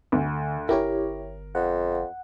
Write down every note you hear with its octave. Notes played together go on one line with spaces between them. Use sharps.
D2 D3
G1 E4 G4 A#4 C#5
F2 F#5